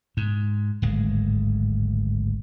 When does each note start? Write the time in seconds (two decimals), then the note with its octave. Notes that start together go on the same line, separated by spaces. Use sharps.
0.17 G#2
0.82 D1 G#1 G#3